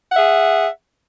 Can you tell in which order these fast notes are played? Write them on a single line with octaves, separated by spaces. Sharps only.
F#5 E5 G#4